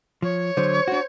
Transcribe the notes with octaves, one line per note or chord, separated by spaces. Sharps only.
F3 C#5
D3 F#3 C5
D4 F#4